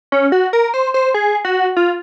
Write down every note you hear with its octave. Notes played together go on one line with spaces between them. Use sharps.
C#4
F#4
A#4
C5
C5
G#4
F#4
F4